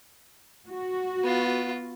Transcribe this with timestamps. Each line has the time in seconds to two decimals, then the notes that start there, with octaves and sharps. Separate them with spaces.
0.69 F#4
1.24 B3 F4